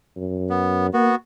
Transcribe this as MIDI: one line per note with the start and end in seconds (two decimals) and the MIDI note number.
0.16 0.92 42
0.50 0.87 59
0.94 1.12 58
0.94 1.15 59
0.94 1.15 66